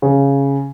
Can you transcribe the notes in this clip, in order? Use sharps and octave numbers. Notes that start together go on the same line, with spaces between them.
C#3